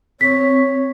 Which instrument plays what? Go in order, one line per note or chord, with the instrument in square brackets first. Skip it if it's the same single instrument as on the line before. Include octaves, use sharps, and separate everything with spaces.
[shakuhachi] C4 [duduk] C#5 [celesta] B6